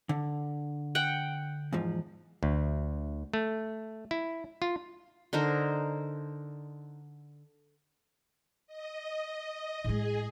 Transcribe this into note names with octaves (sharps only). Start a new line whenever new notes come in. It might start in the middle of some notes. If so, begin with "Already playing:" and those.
D3
F#5 G5
E2 G#2 F3
D2
A3
E4
F4
D3 D#4 A#4 C5
D#5
A2 G#3 G#4